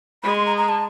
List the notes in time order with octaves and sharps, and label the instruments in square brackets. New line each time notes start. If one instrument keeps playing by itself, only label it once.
[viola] G#3 [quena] B5
[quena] C6
A#5
A#5
A5